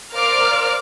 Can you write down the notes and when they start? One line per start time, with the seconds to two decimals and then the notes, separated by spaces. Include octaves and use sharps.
0.15 A#4 C5 D5 F5 D6 F6